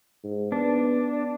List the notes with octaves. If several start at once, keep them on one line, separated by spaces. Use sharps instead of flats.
G#2
B3 D4